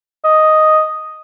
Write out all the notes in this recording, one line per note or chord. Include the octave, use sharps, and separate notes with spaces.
D#5